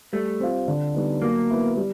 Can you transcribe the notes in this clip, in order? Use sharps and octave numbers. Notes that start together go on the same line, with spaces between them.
G3 A3
C4 F4
D3
G3 B3 D#4
F#3 A#3
B3 E4
G3